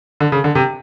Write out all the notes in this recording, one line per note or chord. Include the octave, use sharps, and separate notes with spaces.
D3
C#3
D3
C3